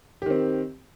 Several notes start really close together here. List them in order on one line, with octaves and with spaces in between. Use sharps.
G4 D#3 C4